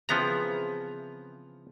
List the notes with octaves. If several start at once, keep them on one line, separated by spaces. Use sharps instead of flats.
C#3 E3 F3 B3 C4 A#5